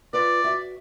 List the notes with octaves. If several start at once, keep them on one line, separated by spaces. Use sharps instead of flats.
F4 B4 D5
F#4 E5